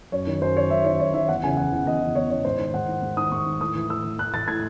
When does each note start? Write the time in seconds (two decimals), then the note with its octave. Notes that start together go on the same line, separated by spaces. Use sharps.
0.12 F#2 C#5
0.27 D#3
0.42 F#2 C5
0.56 D#3 C#5
0.70 F#2 E5
0.85 D#3 C#5
1.00 F#2 C#5
1.14 D#3 E5
1.28 E2 F#5
1.43 C#3 E3 G#5
1.57 E2 F#5
1.72 C#3 E3
1.87 E2 D#5
2.01 C#3 E3
2.15 E2 C#5
2.30 C#3 E3 C#5
2.44 G#2 C5
2.59 D#3
2.74 G#2 F#5
2.88 D#3
3.02 G#2
3.17 D#3 D#6
3.32 G#2 C#6
3.46 D#3
3.60 A2 D#6
3.75 E3
3.89 A2 E6
4.05 E3
4.19 A2 F#6
4.34 E3 A6
4.47 A2 G#6